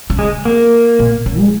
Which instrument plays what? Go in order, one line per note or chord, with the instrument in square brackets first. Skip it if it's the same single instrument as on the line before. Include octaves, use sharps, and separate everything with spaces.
[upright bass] C#3
[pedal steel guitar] G#3
A#3
[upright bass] A#2
C#3
G#3